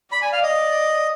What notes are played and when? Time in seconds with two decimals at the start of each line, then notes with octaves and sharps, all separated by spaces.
0.12 D5 B5
0.22 G#5
0.32 F5
0.43 D#5
0.53 D5